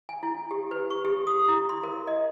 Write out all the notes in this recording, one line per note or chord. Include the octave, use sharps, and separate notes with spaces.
G#5
E4
G4
B4
C#6
G4
D#6
E4
C6
A#4
D#5